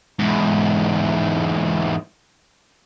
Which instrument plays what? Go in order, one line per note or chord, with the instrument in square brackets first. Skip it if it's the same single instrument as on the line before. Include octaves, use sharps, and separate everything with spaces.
[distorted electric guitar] E2 G#2